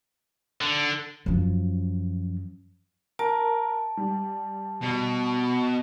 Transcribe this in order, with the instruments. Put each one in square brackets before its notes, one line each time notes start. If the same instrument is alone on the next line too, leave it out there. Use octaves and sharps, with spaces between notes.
[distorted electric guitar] D3
[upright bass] F#2 F3
[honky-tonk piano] A#4 [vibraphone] A5
[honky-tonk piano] G3
[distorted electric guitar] B2